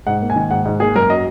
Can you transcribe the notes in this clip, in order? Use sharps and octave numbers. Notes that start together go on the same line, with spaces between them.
G#2 F#5
A#3
G#5
D#3
G#2 F#5
G#2
A#3 G#4
F#2 A#4
F#3 D#5